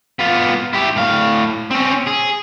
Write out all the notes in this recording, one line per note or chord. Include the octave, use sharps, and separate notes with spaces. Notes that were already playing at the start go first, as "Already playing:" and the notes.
B3 F4
E4 G4
A2 F5
C4 C#4
G#4